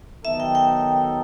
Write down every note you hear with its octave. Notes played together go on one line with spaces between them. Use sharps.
D#3 F#3 B3 D#4 A4 E5
G5
G5